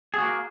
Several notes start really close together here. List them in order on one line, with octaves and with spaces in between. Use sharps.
G#4 F#4 A#3